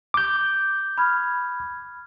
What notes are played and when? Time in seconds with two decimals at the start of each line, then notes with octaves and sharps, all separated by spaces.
0.14 D6 G6
0.98 B5 F6 G#6